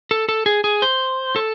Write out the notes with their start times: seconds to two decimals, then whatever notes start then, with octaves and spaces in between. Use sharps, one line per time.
0.11 A4
0.29 A4
0.46 G#4
0.64 G#4
0.82 C5
1.36 A4